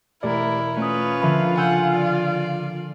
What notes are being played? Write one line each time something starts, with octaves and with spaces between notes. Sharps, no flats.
E1 A3 E4 G4 A#4 D5
A3 C#4 F4 B4 D#6
D3 F3 A#3 E5 B5
C#3 F#5 G#5 E6 G6
D5